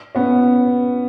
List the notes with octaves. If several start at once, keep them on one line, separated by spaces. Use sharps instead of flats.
B3 C#4